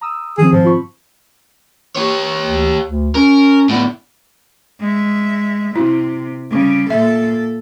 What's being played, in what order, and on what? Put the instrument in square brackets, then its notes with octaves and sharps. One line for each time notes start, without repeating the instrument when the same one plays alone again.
[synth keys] A#5 D#6 E6
[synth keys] D#3 F3 C4 [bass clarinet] G#4
[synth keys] G#2 [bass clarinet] F3
[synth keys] F4 B5 C#6
[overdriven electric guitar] G4 C#5
[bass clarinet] D2
D2
[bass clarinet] C#4 [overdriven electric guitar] A#4
[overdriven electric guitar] A2 D4 [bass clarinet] B3
[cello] G#3 E5
[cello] C3 [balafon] E4 F#4
[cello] C#3 G3
[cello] A#2 A4 [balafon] E5